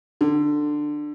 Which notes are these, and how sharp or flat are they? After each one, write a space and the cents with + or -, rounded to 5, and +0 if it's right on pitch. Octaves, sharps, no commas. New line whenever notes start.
D3 +15